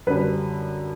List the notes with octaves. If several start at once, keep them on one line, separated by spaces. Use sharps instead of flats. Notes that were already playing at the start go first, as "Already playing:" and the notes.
F#2 D3 G3 B4